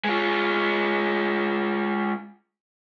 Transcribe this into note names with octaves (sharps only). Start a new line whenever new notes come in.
G#3 F4